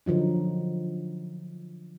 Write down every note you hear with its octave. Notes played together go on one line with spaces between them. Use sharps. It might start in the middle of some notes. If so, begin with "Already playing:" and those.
D3 F3 F#3 D#4